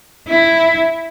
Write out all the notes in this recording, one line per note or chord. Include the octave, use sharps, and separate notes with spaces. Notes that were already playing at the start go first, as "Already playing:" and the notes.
E4